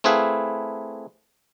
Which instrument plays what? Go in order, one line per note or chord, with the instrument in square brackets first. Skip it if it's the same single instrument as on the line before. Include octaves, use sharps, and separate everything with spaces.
[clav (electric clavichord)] A3 C4 E4 G#4 B4 F5